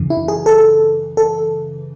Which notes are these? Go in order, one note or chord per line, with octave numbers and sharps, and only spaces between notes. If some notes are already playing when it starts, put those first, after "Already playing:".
Already playing: F#2 C#3 E3
E4
G#4
A4
A4